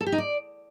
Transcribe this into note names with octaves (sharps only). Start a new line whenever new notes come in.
A4
G4
D#4
D5